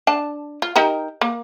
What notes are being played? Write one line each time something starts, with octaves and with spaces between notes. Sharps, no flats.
D4 A5
F4
D#4 G4 A#4
A#3